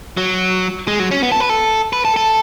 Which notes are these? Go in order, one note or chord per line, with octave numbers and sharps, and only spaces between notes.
F#3
G#3
F#3
C#4
B3
A4
B4
A4
B4
A4
A4